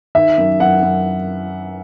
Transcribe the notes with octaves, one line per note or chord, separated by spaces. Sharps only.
D#3 E5
F#2
F#2 F#5
F#2